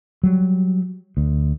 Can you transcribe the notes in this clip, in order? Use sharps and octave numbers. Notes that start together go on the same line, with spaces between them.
F#3 G3
D2